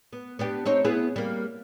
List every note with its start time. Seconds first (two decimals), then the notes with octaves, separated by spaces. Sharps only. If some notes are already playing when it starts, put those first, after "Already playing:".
0.13 B3
0.39 B3 D4 G4
0.66 C4 D#4 C#5
0.85 B3 E4 G#4
1.16 G3 A#3